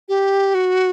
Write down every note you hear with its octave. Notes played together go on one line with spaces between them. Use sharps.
G4
F#4